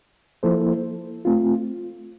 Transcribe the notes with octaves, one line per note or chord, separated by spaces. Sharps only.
F3 A#3 E4 A4 C5
A3 C4 F4